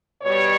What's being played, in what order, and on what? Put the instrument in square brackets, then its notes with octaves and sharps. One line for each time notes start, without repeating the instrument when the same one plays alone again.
[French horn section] B2 G3 C#5